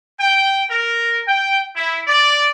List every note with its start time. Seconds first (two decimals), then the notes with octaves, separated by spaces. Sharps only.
0.20 G5
0.70 A#4
1.28 G5
1.76 E4
2.08 D5